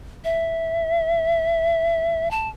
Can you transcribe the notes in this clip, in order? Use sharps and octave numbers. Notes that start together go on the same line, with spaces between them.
E5
A5